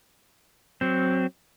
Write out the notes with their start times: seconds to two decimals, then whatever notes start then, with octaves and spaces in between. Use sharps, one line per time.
0.81 F#3 C4